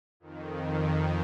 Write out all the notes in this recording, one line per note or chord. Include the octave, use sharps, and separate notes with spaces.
F2 D#3